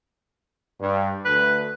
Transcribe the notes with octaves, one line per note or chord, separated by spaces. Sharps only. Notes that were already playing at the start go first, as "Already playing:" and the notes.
G2
D2 B4